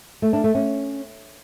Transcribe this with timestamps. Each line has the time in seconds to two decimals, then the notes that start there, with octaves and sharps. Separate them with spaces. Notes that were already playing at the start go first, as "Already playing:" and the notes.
0.22 A3
0.33 D4
0.44 A3
0.55 C#4